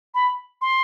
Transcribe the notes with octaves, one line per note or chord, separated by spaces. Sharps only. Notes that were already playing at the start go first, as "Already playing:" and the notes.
B5
C6